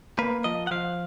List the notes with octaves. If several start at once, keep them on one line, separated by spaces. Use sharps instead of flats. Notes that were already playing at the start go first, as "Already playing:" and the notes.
A#3 B4
F3 D#5
F#5
F3 F5